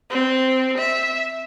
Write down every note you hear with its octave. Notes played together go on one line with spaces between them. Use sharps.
C4
E5